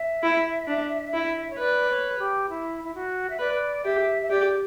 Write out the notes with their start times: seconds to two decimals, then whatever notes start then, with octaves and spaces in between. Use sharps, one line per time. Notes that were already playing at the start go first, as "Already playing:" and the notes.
Already playing: E5
0.23 E4
0.67 D4
1.14 E4
1.50 C#5
1.59 B4 D5
1.89 C#5
2.19 G4
2.49 E4
2.84 E4
2.94 F#4
3.29 E5
3.39 B4 D5
3.84 G4 E5
4.21 E5
4.30 G4 D5